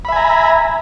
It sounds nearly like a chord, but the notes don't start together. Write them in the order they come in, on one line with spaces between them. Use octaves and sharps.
B5 E5 G#5 A#5